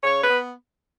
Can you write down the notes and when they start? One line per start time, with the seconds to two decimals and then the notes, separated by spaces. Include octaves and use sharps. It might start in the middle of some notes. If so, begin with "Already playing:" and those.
0.04 C#3 C#5
0.23 B4
0.29 B3